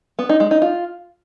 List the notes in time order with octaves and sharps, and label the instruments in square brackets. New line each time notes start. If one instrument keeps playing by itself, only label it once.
[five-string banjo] B3
D#4
G#3
D#4
F4